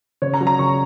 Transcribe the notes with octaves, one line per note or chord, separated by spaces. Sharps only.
C#3 C#5
A#5
F#3
A#5
C#3 C#6